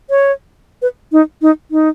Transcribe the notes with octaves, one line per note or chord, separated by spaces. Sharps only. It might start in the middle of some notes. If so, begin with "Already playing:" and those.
C#5
B4
D#4
D#4
D#4